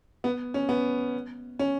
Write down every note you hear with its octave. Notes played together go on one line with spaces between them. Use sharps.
B3
C#4
B3
C#4